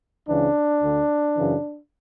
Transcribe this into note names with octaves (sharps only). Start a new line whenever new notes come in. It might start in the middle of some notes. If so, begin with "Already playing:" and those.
C#2 C#3 E3 D4
D2 D3
F#2 C#3 E3